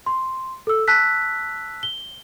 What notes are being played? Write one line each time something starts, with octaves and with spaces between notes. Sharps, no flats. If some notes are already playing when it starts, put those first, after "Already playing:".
C6
A4 E6
A5 E6 F#6 B6
G7